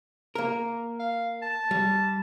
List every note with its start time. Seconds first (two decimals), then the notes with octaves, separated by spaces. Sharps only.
0.35 A#3 A#4
1.00 F5
1.42 A5
1.71 G3